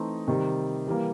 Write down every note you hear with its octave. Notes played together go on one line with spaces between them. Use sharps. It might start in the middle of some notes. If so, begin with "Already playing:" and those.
Already playing: E3 A3 C4 D#4
C3 D#3 G3
E3 G3 A#3